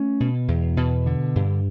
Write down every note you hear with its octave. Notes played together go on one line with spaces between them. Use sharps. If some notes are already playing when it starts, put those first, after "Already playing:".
Already playing: A3 C#4
B2
E2
B2
D3
G2